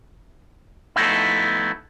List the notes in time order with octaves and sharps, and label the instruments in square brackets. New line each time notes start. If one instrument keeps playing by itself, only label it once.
[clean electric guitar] F3 A3 B3 D#4 E4